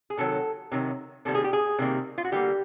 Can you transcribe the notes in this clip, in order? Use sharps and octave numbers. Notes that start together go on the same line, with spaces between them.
G#4
C3 D#3 F#3 A4
C3 D#3 F#3
C3 D#3 G3 A#3 A4
G#4
G4
G#4
C3 D#3 G3 A#3
F4
F#4
D3 G3 A#3 G4